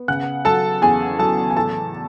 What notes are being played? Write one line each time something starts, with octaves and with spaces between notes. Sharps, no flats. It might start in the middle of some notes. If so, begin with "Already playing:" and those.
Already playing: B3
C#3 F#5 F#6
F#3 A4 A5
E2 G#4 G#5
F#3 A4 A5
G#5
A2 A4 A5